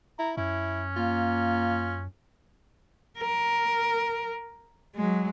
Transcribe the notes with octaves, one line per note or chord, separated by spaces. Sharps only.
E4 A#5
F#2 C#4 E4
A#3 F4
A#4
F#3 G#3